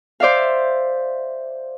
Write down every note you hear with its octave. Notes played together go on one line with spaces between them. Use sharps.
C5 D5 E5 F5